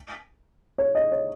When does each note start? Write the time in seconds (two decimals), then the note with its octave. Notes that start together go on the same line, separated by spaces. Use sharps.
0.78 C#5
0.95 D#5
1.12 C#5